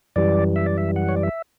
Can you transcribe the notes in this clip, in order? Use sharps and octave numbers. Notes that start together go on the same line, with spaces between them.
F#2 E3 G3 D5
E5
D5
E5
F#5
C#5
D5
E5